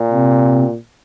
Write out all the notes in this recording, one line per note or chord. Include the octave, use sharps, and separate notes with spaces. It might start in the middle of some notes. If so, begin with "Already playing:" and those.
Already playing: A#2
C3 C4